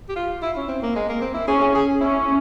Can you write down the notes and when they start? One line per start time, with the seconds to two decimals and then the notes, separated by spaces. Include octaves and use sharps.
0.09 G4
0.16 F4
0.42 E4
0.56 C#4
0.68 C4
0.82 A#3
0.96 G#3
1.09 A#3
1.21 C4
1.34 E4
1.47 C#4 G#4
1.61 G#4
1.75 G#4
2.01 C#4 E4